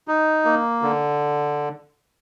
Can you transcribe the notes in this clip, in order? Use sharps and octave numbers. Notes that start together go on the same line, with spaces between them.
D#4
A#3
D3